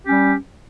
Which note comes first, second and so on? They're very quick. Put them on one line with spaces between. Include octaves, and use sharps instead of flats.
G4 C#4 G3